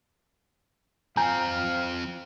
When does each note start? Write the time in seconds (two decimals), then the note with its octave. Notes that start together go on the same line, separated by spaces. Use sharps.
1.17 F3 C4 F5 G#5 A#5 G6